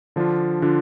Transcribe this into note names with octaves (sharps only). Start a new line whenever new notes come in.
D3 F3 D4 F4
D3 F3 D4 F4